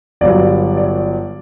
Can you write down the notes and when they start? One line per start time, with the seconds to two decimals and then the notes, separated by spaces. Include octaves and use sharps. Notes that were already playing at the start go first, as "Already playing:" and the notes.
0.21 G1 G2 F#3 D5
0.77 D5